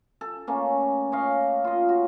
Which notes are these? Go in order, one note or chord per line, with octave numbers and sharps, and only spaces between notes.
A4
A3 A#3 C#4
C#5 D#5 F5
F4 D#5
F#4